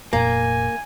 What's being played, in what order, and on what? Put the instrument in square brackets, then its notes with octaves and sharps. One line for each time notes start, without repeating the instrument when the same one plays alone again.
[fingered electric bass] F1 A#2 [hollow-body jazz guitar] A#3 [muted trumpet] G#5